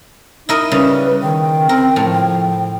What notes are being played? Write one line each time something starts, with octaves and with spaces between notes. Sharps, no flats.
D#4 E4 A#4 D#5
C#3 G3 B4
D#3 G5
C4 A#4
A2 F3